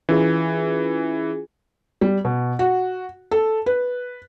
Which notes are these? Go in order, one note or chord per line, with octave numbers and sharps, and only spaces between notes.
E3 C#4 F4 G#4
G3
B2
F#4
A4
B4